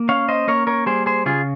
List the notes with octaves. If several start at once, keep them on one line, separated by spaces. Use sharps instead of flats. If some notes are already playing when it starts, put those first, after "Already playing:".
Already playing: A#3
C#4 C#5 F5
C5 D#5
A#3 A#4 C#5
A#4 C#5
G3 G#4 C5
G#4 C5
C#3 F4 G#4